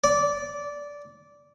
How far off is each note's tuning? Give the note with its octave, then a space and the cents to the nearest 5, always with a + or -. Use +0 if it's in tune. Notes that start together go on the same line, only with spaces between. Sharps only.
D5 -15